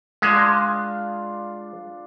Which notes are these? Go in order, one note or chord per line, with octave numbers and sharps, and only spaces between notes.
G#3 D4 F4 F5